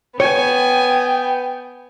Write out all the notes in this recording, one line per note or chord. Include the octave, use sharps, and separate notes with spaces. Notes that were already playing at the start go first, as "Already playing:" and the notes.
B3 C#5 G5 G#5